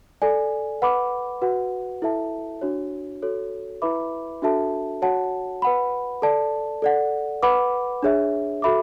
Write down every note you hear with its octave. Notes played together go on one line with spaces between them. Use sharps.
A4 D5 G#5
B4 F#5 B5 D6
F#4 B4 F#5
E4 A4 E5 A5
D4 F#4 C#5
F#4 A4 C#5
E4 B4 E5 B5 D6
D4 F#4 A4 E5 A5
F#4 C#5 F#5 A5
B4 F#5 B5
A4 D5 A5
A4 D5 F#5
B4 F#5 B5 D6
D4 G#4 C#5 E5
F#4 A4 E5 B5 D6